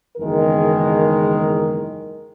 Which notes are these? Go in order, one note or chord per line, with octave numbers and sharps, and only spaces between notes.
F#1 E2 D#3 G#3 A#4